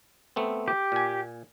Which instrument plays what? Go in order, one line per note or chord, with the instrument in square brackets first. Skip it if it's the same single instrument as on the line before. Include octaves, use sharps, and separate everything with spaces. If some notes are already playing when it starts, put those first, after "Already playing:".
[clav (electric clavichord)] A3 B3 C4
[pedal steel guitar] G4
[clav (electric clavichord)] A#2 G#5